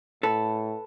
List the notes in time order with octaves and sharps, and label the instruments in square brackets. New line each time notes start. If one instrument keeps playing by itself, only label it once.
[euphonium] A2 [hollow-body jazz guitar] A4 B4 [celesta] A5